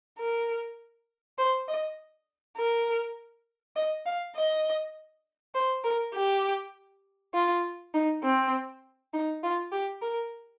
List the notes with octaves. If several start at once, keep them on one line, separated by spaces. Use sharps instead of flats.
A#4
C5
D#5
A#4
D#5
F5
D#5
C5
A#4
G4
F4
D#4
C4
D#4
F4
G4
A#4